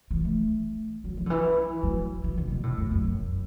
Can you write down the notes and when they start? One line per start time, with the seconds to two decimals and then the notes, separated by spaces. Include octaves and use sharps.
0.11 E3
0.25 A3
1.04 F#3
1.17 E3
1.26 D3
1.30 E3
1.83 F#3
2.24 E3
2.37 D3
2.51 B2
2.63 A2
2.78 F#2
2.91 F#2
3.04 F#2